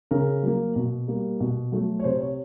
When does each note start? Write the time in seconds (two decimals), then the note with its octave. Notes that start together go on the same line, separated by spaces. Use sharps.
0.11 C#3 A#4
0.43 F#3 A#3
0.76 B2
1.08 G3 A#3
1.40 B2
1.72 F#3 A3
2.00 C#5
2.04 C3 C5
2.21 C#5